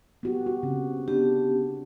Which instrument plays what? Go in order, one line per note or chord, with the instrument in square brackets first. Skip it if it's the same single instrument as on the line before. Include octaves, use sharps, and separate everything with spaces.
[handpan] B3 F#4 G4
F#4
C#3 C4
[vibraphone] B3 C#4 G4 [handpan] D4